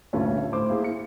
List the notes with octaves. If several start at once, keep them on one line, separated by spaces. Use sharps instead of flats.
D2 G2 A#2 A3 C#4
A2 C5 D6
A#3 E4 G#4
C#7